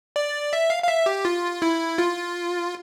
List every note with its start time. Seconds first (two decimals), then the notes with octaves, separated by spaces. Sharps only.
0.16 D5
0.53 E5
0.70 F5
0.83 F5
0.88 E5
1.06 G4
1.25 F4
1.62 E4
1.98 F4